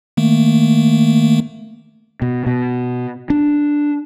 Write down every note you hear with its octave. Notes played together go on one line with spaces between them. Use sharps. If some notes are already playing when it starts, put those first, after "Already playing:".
D#3 A3 A#3
B2
B2
D4